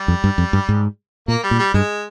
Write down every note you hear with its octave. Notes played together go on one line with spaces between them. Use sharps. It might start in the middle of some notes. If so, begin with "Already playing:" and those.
Already playing: G3
F2
G2
F2
G2
G#2
A#2 A#3
G3
A#2
G3
G2 G#3